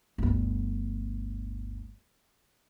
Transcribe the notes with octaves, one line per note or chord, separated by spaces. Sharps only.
G1 D2